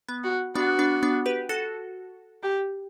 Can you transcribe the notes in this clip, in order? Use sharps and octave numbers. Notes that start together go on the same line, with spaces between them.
B3
F#4
B3 D4 F#4
B3 D4
B3 D4
G4 B4
F#4 A4
G4